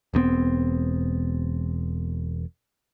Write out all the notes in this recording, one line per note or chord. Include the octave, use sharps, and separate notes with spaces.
E1 G2 B3 C4